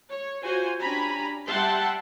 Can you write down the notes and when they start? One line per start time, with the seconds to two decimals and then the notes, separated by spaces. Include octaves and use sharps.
0.11 C#5
0.42 F4 F#4 C5 G#5
0.80 C#4 D4 G4 G#5 A#5 B5
1.47 G3 E5 F#5 G5 A5 C6